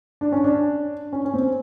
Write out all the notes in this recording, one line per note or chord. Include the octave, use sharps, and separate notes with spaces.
D4
C#4
D4
C#4
C#4
C4